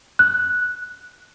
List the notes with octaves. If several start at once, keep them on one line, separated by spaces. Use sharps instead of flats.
F#6